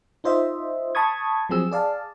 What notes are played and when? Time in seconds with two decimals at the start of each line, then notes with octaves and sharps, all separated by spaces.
0.24 D#4 F4 C5 D#5 E5
0.95 A5 B5 C#6 D#6 G#6
1.49 F3 F#3 C4 G#4 E6
1.72 G#4 D5 F5 A5